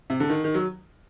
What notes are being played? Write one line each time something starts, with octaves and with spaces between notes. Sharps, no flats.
C3
D3
D#3
D#3
F#3